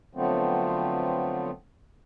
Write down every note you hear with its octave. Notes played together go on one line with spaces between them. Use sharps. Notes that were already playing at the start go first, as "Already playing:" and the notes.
D3 F3 F#3 A3 B3 C4